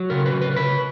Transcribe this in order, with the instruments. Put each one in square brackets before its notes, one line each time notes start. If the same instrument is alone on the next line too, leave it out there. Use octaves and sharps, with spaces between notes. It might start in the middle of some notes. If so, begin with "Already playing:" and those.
Already playing: [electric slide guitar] F#3
C#3 A#4
B4
C#3
B4
A#4
C#3 B4